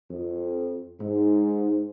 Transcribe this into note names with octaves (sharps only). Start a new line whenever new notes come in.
F2
G#2